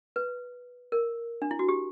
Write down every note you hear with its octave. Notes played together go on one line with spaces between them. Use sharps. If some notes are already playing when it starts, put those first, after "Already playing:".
B4
A#4
D4
E4
F#4
G4